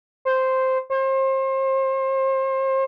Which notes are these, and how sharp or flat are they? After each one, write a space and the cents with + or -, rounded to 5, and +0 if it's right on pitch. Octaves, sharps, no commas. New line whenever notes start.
C5 -5
C5 +35